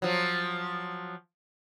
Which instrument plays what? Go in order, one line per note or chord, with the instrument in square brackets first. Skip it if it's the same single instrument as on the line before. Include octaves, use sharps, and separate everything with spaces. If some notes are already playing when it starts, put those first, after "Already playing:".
[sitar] F3 F#3